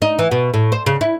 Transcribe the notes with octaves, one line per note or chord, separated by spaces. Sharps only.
D#4
E3
B2
A2
C5
C#3
E4